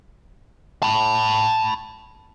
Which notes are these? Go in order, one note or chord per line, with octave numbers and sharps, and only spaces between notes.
A5 B5